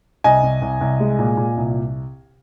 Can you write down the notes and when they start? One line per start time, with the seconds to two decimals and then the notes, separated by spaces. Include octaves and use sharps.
0.24 C2 D#5 G#5
0.43 C2
0.62 C2
0.81 C2
1.00 G#3
1.19 A#2
1.37 A#2
1.57 C2